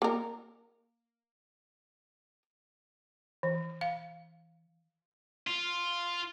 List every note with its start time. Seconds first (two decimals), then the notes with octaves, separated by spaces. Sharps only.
0.02 A#3 A#4
3.43 E3
3.81 F5
5.47 F4